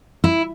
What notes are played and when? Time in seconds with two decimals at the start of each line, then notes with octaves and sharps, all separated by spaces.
0.24 E4